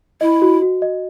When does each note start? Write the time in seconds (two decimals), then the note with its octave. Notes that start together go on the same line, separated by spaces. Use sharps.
0.21 E4 D#5
0.42 F#4
0.62 F#4
0.82 D#5